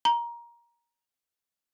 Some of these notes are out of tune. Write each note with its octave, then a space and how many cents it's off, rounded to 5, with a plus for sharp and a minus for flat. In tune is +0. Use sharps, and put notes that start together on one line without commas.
A#5 +15